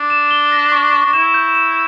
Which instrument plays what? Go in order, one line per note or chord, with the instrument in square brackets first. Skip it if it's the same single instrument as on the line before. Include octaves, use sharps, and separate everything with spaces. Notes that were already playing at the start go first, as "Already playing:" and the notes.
Already playing: [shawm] D4
[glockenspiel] E7
G7
A#6
C#6
C#6
[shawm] D4
[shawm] E4 [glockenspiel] E7
[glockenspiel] G6
E7